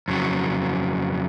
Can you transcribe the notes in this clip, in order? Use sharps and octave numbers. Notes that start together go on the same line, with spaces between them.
F2 C#3 F#3